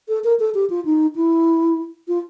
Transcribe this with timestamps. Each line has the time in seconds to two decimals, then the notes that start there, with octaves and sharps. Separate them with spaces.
0.09 A4
0.24 A#4
0.40 A4
0.55 G4
0.70 F4
0.85 D#4
1.16 E4
2.08 F4